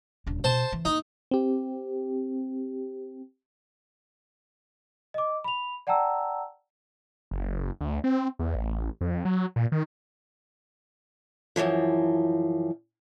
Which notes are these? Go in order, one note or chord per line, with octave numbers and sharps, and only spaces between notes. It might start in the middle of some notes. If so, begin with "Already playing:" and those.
D#1 D4
B2 C5 A5
E3
A#3 D#4
C4 G4
D#5 D6
B5 F7
D5 F#5 G5 A5 A#5 E6
F#1
D2
C4
E2
A1
F2
F#3
A#2
D#3
F#2 B2 E3 F3